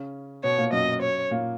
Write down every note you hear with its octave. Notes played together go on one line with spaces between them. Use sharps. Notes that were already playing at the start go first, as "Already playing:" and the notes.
Already playing: C#3 C#4
B2 B3 C#5
A#2 A#3
F#2 F#3 D#5
C#5
A#2 A#3